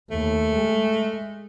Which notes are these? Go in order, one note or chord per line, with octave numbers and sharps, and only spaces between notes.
D#2 A3
G#3